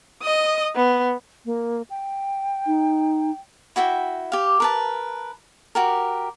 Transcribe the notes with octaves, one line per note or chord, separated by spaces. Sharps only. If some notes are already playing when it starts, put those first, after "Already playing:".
D#5 D#6
B3
A#3
G5
D#4
E4 F#4 E5 G5
G4 F5
A#4 B4 A5
F#4 G4 A#4